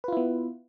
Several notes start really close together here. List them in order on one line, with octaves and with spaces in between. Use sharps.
B4 F4 E4 B3